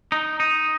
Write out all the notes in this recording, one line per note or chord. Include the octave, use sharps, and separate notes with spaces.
D#4
D#4